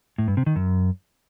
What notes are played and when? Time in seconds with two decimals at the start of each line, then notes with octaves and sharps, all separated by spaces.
0.18 A2
0.28 G2
0.37 C3
0.46 D#3
0.56 F#2